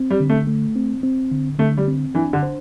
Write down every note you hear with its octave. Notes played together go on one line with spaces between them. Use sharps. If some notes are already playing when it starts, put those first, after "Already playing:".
Already playing: C4
G3
D3
A3
A3
C4
C4
D3
D3 A3
G3
C4
E3 D4
D3
C5